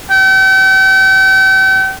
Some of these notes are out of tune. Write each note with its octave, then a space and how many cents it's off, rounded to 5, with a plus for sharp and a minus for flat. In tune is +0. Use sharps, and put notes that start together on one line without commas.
G5 -40